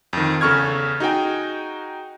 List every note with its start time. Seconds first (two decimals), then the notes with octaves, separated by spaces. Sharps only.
0.13 F2 D#3
0.41 E2 C#3 A4 C#6 F6 G#6
1.00 D#4 F#4 G#4 G5 G#5